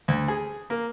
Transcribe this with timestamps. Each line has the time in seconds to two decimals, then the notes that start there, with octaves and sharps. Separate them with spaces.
0.08 D2
0.28 G#4
0.70 A#3